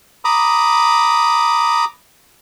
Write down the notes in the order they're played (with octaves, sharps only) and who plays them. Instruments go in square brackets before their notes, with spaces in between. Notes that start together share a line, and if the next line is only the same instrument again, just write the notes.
[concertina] A#5 B5 D6 D#6